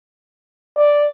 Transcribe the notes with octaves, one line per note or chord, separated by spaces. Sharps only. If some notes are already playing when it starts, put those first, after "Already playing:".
D5